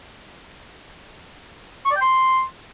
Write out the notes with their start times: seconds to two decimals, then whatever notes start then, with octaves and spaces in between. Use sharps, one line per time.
1.85 C#6
1.91 D5
1.96 G5
2.01 C6